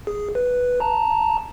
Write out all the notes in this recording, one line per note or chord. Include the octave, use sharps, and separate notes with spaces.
G#4
B4
A5 A#5